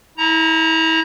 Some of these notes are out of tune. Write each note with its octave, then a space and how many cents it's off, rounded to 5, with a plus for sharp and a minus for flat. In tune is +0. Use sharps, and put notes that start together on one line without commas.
E4 -35 A#5 +0